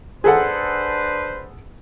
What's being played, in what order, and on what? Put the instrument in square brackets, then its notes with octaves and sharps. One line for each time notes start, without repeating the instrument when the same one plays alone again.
[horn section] D4 B4 C5 [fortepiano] G#4 A4 F#5